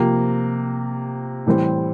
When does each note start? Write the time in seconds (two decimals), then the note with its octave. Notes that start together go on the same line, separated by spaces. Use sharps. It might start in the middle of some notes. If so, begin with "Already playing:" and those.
Already playing: C3 F3 A#3
1.46 A2 E3 G3 C4